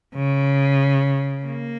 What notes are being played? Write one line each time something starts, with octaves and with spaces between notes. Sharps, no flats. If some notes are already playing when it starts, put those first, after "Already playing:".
C#3
A#3